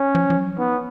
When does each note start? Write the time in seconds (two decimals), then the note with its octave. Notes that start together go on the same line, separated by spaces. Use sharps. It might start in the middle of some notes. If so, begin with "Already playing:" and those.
Already playing: C#4
0.15 F3
0.30 F3
0.37 F#3
0.58 B3 D#4